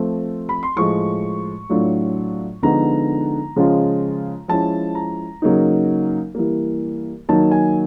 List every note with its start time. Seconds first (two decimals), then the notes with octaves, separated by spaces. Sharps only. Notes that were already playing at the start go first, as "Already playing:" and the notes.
Already playing: F3 A3 C4
0.49 B5
0.63 C6
0.76 A2 F3 G#3 C#6
1.69 A2 F#3 A3 D4 F4
2.63 D3 F3 G#3 B3 D#4 A#5
3.56 C#3 F3 G#3 C#4 F4
4.48 F3 G#3 C#4 E4 A5
4.95 A#5
5.42 C#3 F#3 A#3 D#4
6.35 E3 G3 A#3
7.29 D#3 F#3 A#3 D#4 A5
7.51 G#5